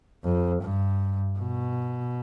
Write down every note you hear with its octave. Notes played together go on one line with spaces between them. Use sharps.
F2
G2
B2